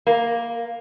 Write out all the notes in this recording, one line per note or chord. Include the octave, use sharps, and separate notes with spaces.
A#3